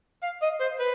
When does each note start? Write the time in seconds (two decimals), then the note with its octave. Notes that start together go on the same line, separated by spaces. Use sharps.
0.23 F5
0.42 D#5
0.60 C5
0.80 B4